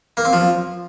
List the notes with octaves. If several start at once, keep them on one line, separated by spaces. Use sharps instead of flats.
A#3
C4
F3